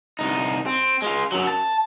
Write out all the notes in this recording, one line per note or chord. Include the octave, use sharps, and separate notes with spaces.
C2 D#4
C4
G#3 F4
F#2 F#3
A5